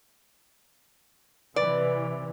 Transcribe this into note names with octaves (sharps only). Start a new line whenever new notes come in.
C3 E3 B4 D5